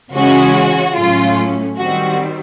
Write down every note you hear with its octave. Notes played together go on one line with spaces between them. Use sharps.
C#3 E3 G#3 C#4 F#4
A2 F#3 A3 C#4 F4
D#3 G3 C4 F#4